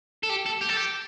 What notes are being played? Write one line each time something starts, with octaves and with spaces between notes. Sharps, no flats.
A4
G4
A4
G4
A4
G4